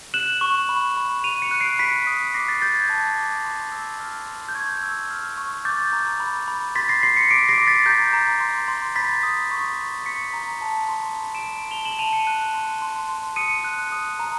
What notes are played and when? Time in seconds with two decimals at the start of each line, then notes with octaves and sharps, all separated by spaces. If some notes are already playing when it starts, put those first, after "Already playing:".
0.14 F#6 E7 F#7
0.41 C#6
0.69 B5
0.97 B5
1.24 B5 D#7 F7
1.42 C#7 D#7
1.51 F#6
1.60 C7 D7
1.79 B5 B6 C#7
2.07 D#6
2.34 D6 A#6 C7
2.48 A6 B6
2.62 D6 G6 A6
2.76 G#6
2.90 A5
3.17 D6
3.45 C6
3.72 E6
4.00 F6
4.27 C6
4.49 G6
4.55 C#6 G#6
4.83 E6
5.10 F6
5.38 C#6
5.65 D6 G6 A6
5.93 A#5
6.20 B5
6.48 B5
6.75 C6 A6 B6
6.89 A#6 C7
7.03 C6 A#6 C7
7.16 B6 C#7
7.31 D6 C7 D7
7.49 A#6 C7
7.58 D6
7.67 A6 B6
7.86 A#5 G6 A6
8.13 A#5
8.41 C6
8.68 C6
8.96 B5 A6 B6
9.23 D#6
9.51 C#6
9.78 C#6
10.06 C#6 B6 C#7
10.33 A#5
10.61 A5
10.89 C6
11.16 B5
11.35 D7 E7
11.44 B5
11.71 A5 F7 G7
11.85 E7 F#7
11.99 A5 D#7 F7
12.13 C#7 D#7
12.27 F#6
12.54 C6
12.82 C6
13.09 C6
13.36 D#6 C#7 D#7
13.64 F#6
13.92 D#6
14.19 A#5